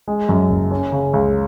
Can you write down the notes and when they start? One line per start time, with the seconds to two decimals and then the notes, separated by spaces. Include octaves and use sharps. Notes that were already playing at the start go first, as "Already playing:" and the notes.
0.08 G#3
0.29 F#2
0.50 F#1
0.71 C#4
0.92 C#3
1.13 C#2